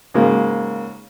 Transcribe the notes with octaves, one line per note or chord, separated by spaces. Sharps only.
G#2 C#3 F#3 G#3 A#3